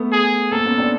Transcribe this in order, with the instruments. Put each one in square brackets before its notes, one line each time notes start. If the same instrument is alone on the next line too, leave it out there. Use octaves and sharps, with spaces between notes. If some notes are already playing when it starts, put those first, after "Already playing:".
Already playing: [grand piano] A3 B3
[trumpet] G#4
[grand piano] A#3 C4 [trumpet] A4
[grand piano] B3 C#4
C4 D4